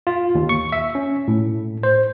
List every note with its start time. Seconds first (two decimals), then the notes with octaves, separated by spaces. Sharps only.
0.07 F4
0.35 D#2
0.49 C#6
0.72 E5
0.95 C#4
1.28 A2
1.83 C5